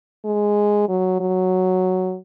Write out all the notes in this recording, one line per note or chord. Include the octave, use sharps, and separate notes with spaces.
G#3
F#3
F#3